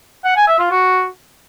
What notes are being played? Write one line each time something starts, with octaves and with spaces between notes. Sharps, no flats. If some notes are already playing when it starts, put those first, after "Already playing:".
F#5
G#5
E5
F4
F#4